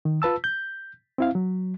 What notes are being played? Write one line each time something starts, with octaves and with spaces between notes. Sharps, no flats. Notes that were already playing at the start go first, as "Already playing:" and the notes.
D#3
F4 B4 A5 E6
G6
C4 E4 F5
F#3